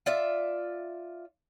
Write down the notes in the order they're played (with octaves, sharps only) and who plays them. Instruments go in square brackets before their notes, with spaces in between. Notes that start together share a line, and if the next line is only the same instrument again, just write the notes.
[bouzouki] F4 D5 E5